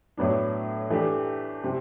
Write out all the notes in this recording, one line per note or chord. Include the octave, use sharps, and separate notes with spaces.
A2 F#3 B3 D4
E3 A3 D4 G4
C3